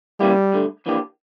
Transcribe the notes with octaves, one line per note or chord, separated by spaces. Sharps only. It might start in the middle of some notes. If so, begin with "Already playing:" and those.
C#3 E3 G3 A#3 E4 G4
G2 D3 A3
F2 E3 A#3 D4 G4